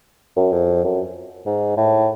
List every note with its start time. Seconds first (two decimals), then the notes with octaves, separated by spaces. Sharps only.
0.36 F#2
0.52 F2
0.84 F#2
1.46 G#2
1.77 A2